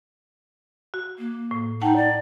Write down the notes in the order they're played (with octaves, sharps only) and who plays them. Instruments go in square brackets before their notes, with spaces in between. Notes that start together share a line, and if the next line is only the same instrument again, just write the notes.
[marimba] F#4
[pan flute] A#3
[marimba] A2
[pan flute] D#4 [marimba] F#5 G5 A5
[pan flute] D5